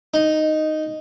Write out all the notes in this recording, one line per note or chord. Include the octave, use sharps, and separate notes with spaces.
D#4